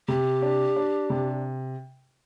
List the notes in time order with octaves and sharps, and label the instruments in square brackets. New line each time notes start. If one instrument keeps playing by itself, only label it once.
[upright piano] C3 [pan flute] G4
[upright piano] D4
D4
C3